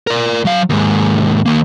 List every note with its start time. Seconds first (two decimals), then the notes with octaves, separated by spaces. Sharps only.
0.07 A#4 D5
0.45 F#3 F5
0.70 D#2 G#2
1.46 D#3 A#3